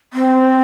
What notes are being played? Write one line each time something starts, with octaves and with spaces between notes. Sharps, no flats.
C4